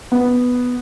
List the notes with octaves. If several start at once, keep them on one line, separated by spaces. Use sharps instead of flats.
B3